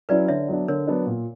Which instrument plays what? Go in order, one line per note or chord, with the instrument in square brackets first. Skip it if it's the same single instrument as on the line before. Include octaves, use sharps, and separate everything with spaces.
[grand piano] F#3 C#4 E4 [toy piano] B4 D5
[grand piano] D3 [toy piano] C#5 E5
[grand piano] F#3 B3 D4
[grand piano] D3 [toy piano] A#4 C#5
[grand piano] F#3 B3 D4
A#2